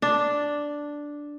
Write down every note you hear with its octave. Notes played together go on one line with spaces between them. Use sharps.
D4